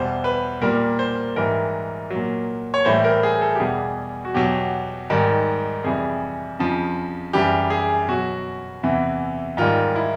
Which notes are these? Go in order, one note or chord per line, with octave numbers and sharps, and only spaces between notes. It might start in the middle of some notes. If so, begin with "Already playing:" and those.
Already playing: E2 B2 G3 C5
B4
A#2 G3 A#4
C5
G#2 E3 G3 A#4
A#2 F#3
C#5
A2 E3 G3 C5
A#4
G#4
A4
G4
E2 B2 G3 G#4
F#4
E2 B2 F#3 G4
G#2 D#3 G3
F2 C3 E3 G3 G#4
F2 C#3 F3
F#2 C#3 E3 G3 G4
G#4
B2 F#3 F#4
E2 C3 E3
G#2 D#3 G3 F4
E4